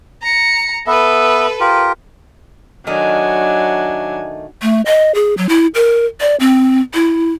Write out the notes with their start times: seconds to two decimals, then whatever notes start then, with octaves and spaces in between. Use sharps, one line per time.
0.22 A#5 C#7
0.87 B3 A4 B4 E5
1.60 F4 G4 A#4
2.87 D#3 F#3 A3 D4 D#4 G#5
4.62 A3
4.86 D#5
5.15 G#4
5.38 F#3
5.49 E4
5.75 A#4
6.21 D5
6.40 C4
6.94 E4